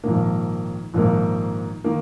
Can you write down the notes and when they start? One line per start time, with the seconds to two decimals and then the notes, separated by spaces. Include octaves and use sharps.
0.04 A#1 G#2 D#3 A#3
0.94 A#1 G#2 D#3 A#3
1.84 D#3 A#3